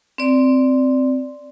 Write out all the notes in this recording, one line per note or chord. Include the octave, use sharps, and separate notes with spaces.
C4 D5